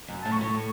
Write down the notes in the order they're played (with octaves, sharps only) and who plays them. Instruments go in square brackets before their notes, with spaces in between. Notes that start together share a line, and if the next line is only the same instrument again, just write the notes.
[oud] F#2
[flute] A5
[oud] A2
[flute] C#6
[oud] A2